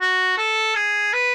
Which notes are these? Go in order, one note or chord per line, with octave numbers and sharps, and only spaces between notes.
F#4
A4
G#4
B4